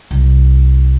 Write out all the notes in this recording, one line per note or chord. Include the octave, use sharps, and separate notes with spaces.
C2